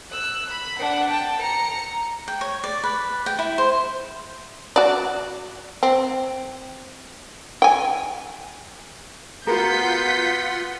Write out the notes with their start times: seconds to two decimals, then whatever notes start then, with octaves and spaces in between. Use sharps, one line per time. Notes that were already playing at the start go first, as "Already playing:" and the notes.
0.11 E6 F#6
0.49 B5
0.78 D4 F#5
1.10 G5 A5
1.39 A#5 C#7
2.28 G5
2.41 C#5
2.64 D5
2.84 B4
3.26 G5
3.39 E4
3.58 C5
4.76 F#4 D5
5.83 C4
7.62 G5 G#5
9.47 B3 F4 F#4 A#4 F#5 C6 G6 B6